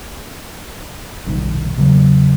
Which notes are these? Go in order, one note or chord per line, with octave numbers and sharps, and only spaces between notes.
F1 B1 G2 D#3
E2 C#3 F#3 A#3